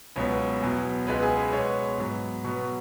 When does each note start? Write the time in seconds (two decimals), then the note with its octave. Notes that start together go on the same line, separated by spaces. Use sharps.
0.16 C#2 B2 F#3 B3 C#5
0.62 E2 B2 F#3 B3
1.07 C#2 B2 G#3 B3 B4
1.23 G#4
1.37 B4
1.53 B2 G#3 B3 C#5
1.98 G#2 F#3 B3
2.44 B2 F#3 B3 C#6